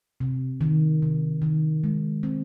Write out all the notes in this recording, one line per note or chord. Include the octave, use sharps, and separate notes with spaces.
C3
D#3
C3
D#3
G#3
C4